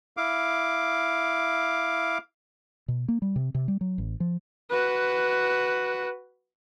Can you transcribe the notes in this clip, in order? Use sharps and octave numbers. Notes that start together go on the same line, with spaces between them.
E4 F5 D6
B2
A#3
G3
C3
C3
G3
F#3
A1
F3
F#4 B4